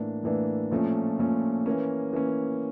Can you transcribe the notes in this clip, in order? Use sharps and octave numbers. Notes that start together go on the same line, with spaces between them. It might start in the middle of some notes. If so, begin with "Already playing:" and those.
Already playing: A2 E3 A#3 D4
A2 E3 A#3 D4
A#2 F3 A3 C#4
A#2 F3 A3 C#4
E3 A#3 C#4
E3 A#3 C#4